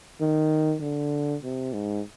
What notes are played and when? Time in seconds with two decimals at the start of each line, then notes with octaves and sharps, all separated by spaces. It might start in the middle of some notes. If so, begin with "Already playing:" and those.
0.21 D#3
0.82 D3
1.43 C3
1.73 G#2